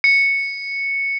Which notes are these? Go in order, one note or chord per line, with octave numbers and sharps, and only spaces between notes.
C#7